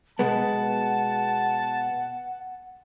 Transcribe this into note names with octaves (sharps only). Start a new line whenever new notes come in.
B2 G#3 B3 F#5 A5